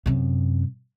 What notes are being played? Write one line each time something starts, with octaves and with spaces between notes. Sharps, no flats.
F#2 C3